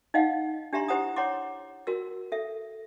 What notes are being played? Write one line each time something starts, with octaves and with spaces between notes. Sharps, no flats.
D#4 D#5 F5 F#5
D4 G4 E5 A#5 C6
E4 G4 C5 F#5 A#5 D#6
C#5 F#5 A#5 C6 D6
F#4 A#4 E6
A4 E5